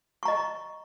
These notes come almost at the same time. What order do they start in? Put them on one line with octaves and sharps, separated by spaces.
C#6 A#5 D#5